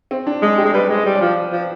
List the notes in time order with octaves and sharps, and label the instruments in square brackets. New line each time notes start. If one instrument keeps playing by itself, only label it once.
[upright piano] C4
D4
[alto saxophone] G#3 [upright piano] D4
[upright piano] G4
[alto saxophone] G#3
[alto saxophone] G3 [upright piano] B4
[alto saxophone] G#3 [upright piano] C5
[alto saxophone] G3
[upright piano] D5
[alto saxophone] F3
F3